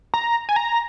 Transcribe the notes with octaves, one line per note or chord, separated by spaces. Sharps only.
A#5
G#5
A#5